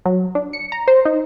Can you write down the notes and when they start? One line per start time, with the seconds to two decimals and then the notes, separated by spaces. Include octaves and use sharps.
0.05 F#3
0.35 D4
0.53 C#7
0.72 A#5
0.88 C5
1.05 D#4